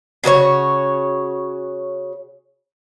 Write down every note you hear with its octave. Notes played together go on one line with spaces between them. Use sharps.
C#3 F#4 A#4 C#5